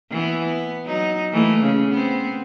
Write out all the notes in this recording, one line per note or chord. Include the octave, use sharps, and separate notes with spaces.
E3 B3
B3
F#3 D#4
E3 A3 A#3
C#3
B3 C4